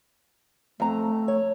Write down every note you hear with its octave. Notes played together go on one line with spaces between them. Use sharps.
F2 A3 A#5
C#5